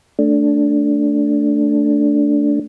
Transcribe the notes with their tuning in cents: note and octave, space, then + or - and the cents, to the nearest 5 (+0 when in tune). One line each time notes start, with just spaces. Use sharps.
A3 +0 D4 -10